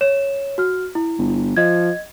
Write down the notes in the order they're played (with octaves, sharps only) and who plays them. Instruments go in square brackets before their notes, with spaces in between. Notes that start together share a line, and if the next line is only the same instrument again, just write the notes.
[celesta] C#5 E7
F#4 F6
E4
[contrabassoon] G1
[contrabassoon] F3 [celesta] D#5 G#6